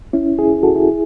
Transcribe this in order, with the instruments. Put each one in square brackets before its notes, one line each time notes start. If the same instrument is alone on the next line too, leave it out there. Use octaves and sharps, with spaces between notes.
[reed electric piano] C#4 E4
E4 G#4
F#4 A4
E4 G#4